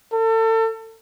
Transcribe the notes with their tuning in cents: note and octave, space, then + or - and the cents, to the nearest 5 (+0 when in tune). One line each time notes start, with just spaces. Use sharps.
A4 +35